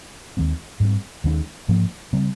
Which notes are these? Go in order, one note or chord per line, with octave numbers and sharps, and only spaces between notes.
D#2 D#3 G#3 C4
G#2 G3 C4
D#2 D#3 G#3 C#4
G#2 F3 A#3 C#4
C#3 G3 C4